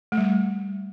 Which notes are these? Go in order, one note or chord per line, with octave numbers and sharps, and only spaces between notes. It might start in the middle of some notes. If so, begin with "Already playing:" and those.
A3
G3